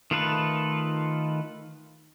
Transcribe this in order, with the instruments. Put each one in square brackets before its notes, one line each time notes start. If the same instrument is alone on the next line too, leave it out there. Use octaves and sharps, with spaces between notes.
[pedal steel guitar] D#3 A3 F4 A4 B4